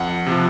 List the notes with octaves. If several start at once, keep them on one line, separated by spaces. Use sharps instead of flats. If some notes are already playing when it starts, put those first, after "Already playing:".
Already playing: F2 F#5
C3
F3